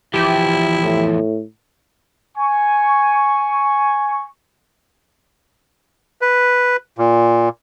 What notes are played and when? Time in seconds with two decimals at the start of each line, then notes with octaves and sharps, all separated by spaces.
0.14 E2 F3 E4 G4
0.83 A2
2.37 G#5 C#6
6.22 B4
6.98 A#2